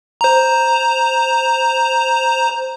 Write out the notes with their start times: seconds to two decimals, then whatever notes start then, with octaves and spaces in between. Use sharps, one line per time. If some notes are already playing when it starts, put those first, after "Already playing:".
0.21 C5 A#5